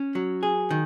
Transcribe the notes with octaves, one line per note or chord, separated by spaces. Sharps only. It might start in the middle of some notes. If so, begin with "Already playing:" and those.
Already playing: C#4
F#3
G#4
D#3